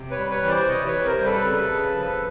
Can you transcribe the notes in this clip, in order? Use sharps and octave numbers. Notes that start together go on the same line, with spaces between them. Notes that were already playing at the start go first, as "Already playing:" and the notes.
Already playing: C3
B4 C#5
G3
B4 C#5
E3
C5 D5
C3 C#5 D#5
B4 C#5
C3
A#4 C5
G3
A4 B4
C#3
C#3
F3